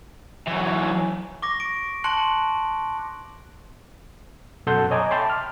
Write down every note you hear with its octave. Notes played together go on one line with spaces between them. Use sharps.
E3 F#3
C#6 D6 A#6
D7
A5 C6 C#6 F#6 C#7 F#7
F#2 B2 A4 F#5 C6 G6
C#5 D#5 G#5 A#5 D6
E5 G5 A5 B5 C6 D6
F6